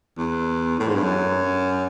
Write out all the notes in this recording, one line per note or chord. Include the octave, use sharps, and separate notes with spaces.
E2
A2
G#2
G2
F#2